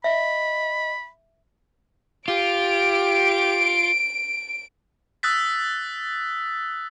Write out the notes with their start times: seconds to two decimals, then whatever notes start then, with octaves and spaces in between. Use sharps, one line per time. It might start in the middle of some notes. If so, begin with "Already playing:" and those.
0.04 D#5 E5 B5
2.28 F4 G4 D7
5.23 D#6 E6 F#6 A6 B6